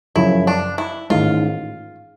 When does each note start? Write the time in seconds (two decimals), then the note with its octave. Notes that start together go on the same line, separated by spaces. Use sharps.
0.16 F#2 C#3 F3 E4
0.47 D4
0.78 E4
1.10 A1 G#2 D#3 F4